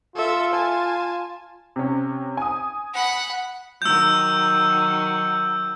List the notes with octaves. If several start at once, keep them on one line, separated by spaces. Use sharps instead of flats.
F4 A4 E5
G#5 A5
C3 C#4
G#5 D#6
F#5 B5
D#3 F#3 E6 G6